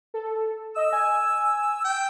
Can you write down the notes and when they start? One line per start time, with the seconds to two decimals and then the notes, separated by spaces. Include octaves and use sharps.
0.14 A4
0.76 D#5 E6
0.93 G#5
1.85 G5